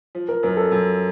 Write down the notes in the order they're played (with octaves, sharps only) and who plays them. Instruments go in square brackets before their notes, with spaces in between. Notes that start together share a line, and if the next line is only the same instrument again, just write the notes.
[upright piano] F3
[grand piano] A#4
[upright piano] F#2 [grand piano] A#4
[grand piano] A4
[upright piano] F#2